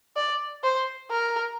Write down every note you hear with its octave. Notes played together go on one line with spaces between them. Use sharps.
D5
C5
A#4